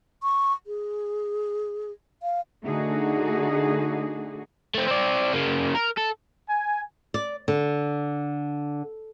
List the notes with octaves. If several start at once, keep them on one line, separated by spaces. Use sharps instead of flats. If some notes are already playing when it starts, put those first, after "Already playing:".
C#6
G#4
F5
D3 A3 D#4 F#4 G#4
A3 C4
C4 D5
C#3 A#3
A#4
A4
G#5
D5
D3